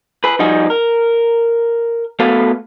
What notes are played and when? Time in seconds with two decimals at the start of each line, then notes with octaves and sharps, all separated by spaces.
0.24 G#4 B4
0.39 F3 G3 D#4 F#4 G#4
0.70 A#4
2.19 A3 B3 F#4 A4 B4 F5